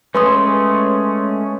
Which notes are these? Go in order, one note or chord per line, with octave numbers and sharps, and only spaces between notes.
G#3 A3 C#4 B4 C6 D#6